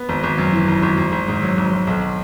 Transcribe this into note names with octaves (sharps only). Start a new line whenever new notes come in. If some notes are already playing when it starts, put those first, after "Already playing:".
Already playing: B3
G#1
G#1
F#2
E3
G#1
G#1
G#1
G#1
G#2
F#3
G#1
G#1
B1